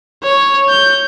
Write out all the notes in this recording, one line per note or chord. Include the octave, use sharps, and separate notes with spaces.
C#5
G6